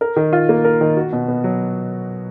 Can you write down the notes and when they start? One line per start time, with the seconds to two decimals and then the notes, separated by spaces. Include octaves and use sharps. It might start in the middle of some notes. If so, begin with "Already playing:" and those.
0.01 A#4
0.16 D#3
0.33 F4
0.49 A#3
0.65 A#4
0.81 D#3
0.97 F#4
1.13 B2
1.28 B3
1.44 F#3